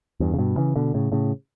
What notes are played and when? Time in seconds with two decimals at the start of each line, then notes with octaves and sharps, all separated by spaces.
0.20 E2 G2
0.34 C#3
0.38 G2 B2
0.57 C#3 E3
0.76 B2 D3
0.94 A2 C#3
1.12 A2 C#3